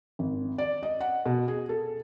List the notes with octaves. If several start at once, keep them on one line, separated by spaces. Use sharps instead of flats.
G#1
D5
D#5
F#5
B2
G#4
A4